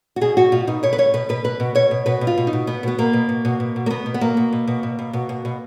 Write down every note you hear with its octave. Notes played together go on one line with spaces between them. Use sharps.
F#4
B2 G#4
B2 F#4
B2 F4
B2 D#4
B2 C#5
B4
B2 C#5
B2 B4
B2 B4
B2 B4
B2
B2 C#5
B2
B2 B4
B2
F4
B2
D#4
B2
B2 B3
B2 B3
B2 A#3
B2
B2
B2
B2
B2
A#3
B2 B3
B2
B3
B2 A#3
B2
B2
B2
B2
B2
B2
B2
B2